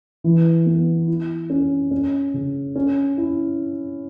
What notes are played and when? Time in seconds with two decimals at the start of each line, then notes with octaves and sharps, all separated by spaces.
0.24 E3
0.66 B3
1.08 E4
1.50 C#4
1.91 C#4
2.34 C#3
2.75 C#4
3.17 E4